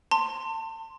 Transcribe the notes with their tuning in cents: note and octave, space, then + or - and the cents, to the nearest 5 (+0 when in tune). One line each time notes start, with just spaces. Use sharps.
A5 +30 C6 +0